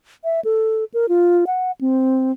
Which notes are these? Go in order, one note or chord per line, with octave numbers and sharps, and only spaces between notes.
E5
A4
A#4
F4
F#5
C4